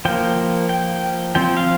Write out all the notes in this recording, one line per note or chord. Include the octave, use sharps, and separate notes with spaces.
F3 A#3 G5
G5
F3 C4 G5
F5